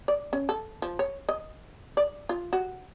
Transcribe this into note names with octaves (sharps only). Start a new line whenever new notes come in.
D5
C#4
A4
F3
C#5
D#5
D5
F4
F#4